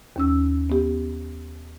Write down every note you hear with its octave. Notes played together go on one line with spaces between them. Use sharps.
D#2 C#4 E6
B3 G4